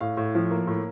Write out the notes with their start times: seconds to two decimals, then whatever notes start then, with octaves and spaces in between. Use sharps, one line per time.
0.01 A2 F5
0.17 A2
0.35 F3
0.51 A#3
0.67 A2